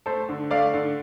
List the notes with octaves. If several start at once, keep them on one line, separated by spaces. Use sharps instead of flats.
A3 A4 C5
D3
A3 D5 F5
D3